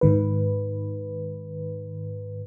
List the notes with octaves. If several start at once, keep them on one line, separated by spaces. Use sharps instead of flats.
G#2 D#3 B4